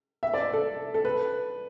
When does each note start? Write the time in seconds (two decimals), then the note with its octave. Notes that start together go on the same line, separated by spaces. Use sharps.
0.23 E5
0.34 D5
0.53 A4
0.94 A4
1.05 B4